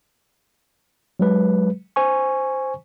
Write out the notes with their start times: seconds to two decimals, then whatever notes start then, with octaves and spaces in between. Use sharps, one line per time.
1.20 F#3 G#3 B4
1.96 C5 G#5 C#6